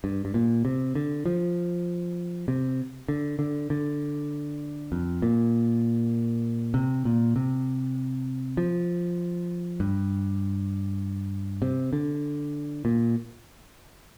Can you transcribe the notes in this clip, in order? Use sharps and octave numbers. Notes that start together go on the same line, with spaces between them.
G2
G2
A#2
C3
D3
F3
C3
D3
D3
D3
F2
A#2
C3
A#2
C3
F3
G2
C3
D3
A#2